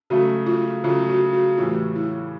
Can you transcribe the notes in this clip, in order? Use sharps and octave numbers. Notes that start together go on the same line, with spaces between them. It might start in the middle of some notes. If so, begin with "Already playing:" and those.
C#3 F#3 A3 F#4
F4
C#3 F#3 A3 F4
F#4
F#4
A2 E3 G3 F4
E4